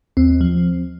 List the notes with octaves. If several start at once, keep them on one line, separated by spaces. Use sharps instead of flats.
D#2 C4
F3